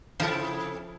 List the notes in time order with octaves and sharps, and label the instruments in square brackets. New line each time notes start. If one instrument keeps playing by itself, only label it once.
[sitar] C3 E4 A4 [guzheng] F3